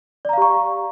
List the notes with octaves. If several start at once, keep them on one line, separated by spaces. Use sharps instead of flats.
G4 D5 F5 A#5 C#6